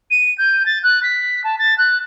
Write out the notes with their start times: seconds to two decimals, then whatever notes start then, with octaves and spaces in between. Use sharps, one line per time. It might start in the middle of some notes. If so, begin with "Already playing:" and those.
0.11 D#7
0.38 G6
0.66 A6
0.83 F#6
1.03 B6
1.44 A5
1.59 A6
1.78 F#6